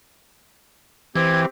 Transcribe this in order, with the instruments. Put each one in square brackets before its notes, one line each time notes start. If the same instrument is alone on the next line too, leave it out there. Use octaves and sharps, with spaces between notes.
[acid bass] E3 [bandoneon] C4 G4 [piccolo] G#6